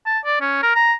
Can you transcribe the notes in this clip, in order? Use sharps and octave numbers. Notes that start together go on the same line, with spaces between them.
A5
D5
C#4
A#4
A#5